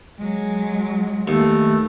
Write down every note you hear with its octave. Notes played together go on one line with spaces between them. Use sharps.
F#3 G#3
D#2 A3